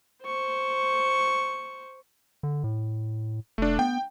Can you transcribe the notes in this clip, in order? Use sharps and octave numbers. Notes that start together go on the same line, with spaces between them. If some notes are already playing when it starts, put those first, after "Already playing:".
C5 C#6
D3
A2
F1 A3 D4
B3 G5